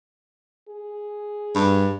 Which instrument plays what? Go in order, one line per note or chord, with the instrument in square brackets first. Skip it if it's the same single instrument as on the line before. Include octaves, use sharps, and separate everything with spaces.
[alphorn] G#4
[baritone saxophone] G2